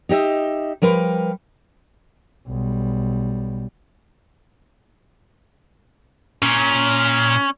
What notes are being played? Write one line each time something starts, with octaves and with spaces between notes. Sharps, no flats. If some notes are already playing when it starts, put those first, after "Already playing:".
D#4 G4 D#5 E5
F3 G3 A#4 B4
B1 G3
A#2 C#4